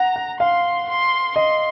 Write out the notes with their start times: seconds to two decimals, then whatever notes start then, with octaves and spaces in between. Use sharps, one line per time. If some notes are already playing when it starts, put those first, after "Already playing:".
Already playing: F#5 A#5
0.16 F#5
0.40 F5 C6
0.89 C6
1.36 D#5 C6